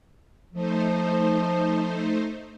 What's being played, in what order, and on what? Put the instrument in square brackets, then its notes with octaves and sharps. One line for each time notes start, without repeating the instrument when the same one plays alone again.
[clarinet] F3 [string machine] A3 D#4 C5